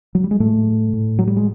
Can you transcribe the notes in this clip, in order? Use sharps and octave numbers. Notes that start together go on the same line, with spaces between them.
F#3
G3
G#3
A2 A3
A2
F#3
G3
G#3